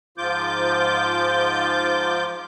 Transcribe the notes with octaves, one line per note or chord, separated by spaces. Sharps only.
G#2 F3 F4 D6 G6